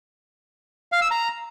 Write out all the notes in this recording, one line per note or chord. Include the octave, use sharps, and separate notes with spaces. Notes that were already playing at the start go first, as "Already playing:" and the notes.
F5
E6
A#5